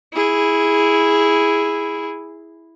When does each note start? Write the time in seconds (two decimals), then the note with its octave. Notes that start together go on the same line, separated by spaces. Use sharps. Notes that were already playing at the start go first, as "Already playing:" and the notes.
0.13 E4 G#4